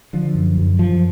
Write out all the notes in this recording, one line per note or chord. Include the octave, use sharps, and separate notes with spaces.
D3 F3
F#2
F#2
F#2 F3